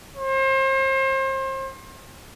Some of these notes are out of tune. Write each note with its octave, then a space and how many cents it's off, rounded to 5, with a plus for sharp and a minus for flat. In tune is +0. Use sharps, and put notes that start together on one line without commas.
C5 +35